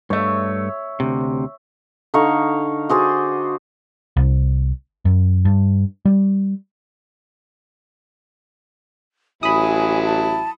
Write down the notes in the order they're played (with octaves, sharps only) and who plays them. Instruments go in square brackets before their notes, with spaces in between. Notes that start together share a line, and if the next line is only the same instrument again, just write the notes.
[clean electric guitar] G2 A3 [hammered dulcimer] C#5 E5
[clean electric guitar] D2 C3
[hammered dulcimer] D3 D#4 F5 C#6
F#4 G#4 C5 D5
[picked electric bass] C2
F#2
G2
G3
[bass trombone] A1 [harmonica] F#3 E4 [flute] G#5 [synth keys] B5 D#6
[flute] A5